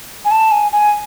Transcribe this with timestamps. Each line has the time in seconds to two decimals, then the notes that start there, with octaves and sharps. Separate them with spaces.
0.25 G#5
0.31 A5
0.52 G#5
0.72 G#5